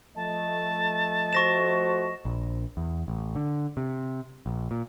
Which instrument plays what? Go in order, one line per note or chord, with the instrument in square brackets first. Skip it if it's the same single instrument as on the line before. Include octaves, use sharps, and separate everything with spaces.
[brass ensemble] F3 A3 D#5 [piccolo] A5
[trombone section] F#4 C5 [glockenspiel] C#6 A#6 E7
[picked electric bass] A#1
E2
A1
D3
C3
A#1
A#2